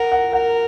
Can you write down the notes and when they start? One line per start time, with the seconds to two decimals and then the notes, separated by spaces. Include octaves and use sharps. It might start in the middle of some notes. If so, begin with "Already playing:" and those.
Already playing: A#4 F#5
0.12 F#5
0.33 A#4 F#5